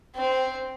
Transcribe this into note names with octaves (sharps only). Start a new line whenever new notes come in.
C4